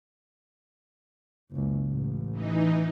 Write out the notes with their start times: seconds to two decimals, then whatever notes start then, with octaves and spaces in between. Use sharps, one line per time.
1.51 F#1 C#2
1.86 A1
2.31 E3 D#4